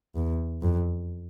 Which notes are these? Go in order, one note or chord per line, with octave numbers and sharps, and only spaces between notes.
E2
F2